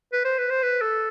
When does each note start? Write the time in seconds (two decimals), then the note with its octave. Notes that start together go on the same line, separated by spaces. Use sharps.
0.13 B4
0.25 C5
0.38 B4
0.50 C5
0.63 B4
0.81 A4